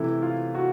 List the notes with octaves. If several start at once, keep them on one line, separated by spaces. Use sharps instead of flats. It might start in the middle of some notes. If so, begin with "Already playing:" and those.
Already playing: C3 E3 A3 E4
F4
F#4